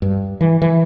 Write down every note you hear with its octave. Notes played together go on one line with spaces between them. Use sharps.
G2
E3
E3